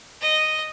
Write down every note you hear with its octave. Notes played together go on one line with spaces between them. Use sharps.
D#5